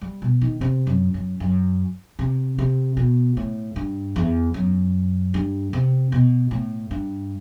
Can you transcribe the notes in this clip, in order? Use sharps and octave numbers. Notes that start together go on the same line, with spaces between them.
G3
B2
D#3
C3
F#2
F#2
F#2
C3
C3
B2
A2
G2
E2
F#2
G2
C3
B2
A2
G2